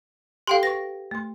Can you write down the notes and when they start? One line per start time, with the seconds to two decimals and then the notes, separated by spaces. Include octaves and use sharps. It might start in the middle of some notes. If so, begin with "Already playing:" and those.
0.47 G4 A4 F5 G5 C6
0.63 B4 C#6 A#6
1.11 A3 C6